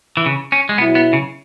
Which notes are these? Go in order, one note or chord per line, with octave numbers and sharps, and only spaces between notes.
E3
C#3
C#4
G#3
B2 F#3 B3 E4
B3
C#3